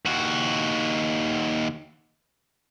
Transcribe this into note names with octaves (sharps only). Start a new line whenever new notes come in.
D#2 F#4